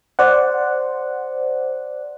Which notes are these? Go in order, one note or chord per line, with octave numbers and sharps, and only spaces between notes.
C5 D5 F#5